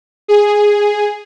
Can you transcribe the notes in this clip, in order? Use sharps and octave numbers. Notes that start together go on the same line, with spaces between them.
G#4